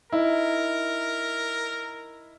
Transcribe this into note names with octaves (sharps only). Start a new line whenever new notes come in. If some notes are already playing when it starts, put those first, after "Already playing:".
D#4 E4 A#4